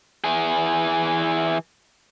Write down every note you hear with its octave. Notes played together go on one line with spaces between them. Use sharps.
E3 G#4